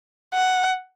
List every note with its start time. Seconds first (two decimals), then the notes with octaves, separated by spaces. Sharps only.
0.34 F#5